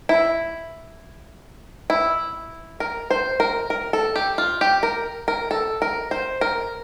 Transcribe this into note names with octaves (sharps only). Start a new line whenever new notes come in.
E4
E4
A#4
C5
A#4
A#4
A4
G4
F4
G4
A#4
A#4
A4
A#4
C5
A#4